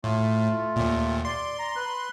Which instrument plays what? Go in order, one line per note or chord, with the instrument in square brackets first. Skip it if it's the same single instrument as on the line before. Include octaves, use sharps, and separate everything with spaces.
[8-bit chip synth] A2 [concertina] A3 F4
[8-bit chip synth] D#2 A#2
[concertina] D5 [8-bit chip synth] C6
[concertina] A#5
B4 F#6